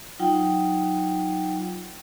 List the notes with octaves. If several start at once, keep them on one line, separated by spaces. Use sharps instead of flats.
F#3 D#4 F4 F#5 G5